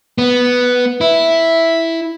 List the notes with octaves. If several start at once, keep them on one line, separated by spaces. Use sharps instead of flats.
B3
E4